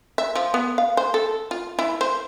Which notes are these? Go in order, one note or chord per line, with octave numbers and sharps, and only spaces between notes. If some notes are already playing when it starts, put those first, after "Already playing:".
E5
F3
B3
F5
C5
A4
F4
E4
C5